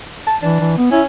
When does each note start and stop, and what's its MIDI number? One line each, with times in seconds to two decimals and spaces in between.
0.27 0.37 81
0.43 0.61 52
0.43 0.74 62
0.61 0.75 52
0.78 0.89 59
0.92 1.06 61
0.92 1.01 64